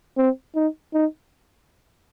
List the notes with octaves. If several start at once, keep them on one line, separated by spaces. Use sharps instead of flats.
C4
D#4
D#4